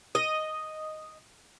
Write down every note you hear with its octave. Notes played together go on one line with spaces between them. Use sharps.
D#5